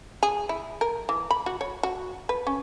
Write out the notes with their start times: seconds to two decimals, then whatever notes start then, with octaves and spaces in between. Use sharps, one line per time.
0.23 G#4
0.49 E4
0.81 A#4
1.09 E3
1.31 B5
1.46 F#4
1.61 C#5
1.83 F#4
2.29 B4
2.47 C#4